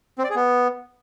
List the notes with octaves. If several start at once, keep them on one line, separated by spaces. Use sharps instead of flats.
C4
D5
G#4
B3